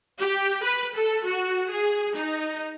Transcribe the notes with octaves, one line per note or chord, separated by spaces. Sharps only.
G4
B4
A4
F#4
G#4
D#4